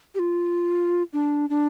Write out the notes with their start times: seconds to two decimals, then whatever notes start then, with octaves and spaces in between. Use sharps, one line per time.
0.15 G4
0.19 F4
1.13 D4
1.50 D4